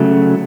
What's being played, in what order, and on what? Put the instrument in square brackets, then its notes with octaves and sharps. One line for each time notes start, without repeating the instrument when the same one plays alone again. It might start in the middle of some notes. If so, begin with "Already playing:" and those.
Already playing: [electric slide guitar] C#3 F#3 A3